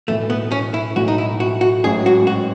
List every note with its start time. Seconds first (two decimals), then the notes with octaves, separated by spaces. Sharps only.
0.08 B1 A2 E3 A3
0.30 B3
0.52 C#4
0.74 E4
0.96 B1 A2 E3 F#4
1.08 D#4
1.18 E4
1.40 F#4
1.61 F#4
1.84 A1 G#2 F#3 C#4 E4 G#4
2.06 F#4
2.27 F#4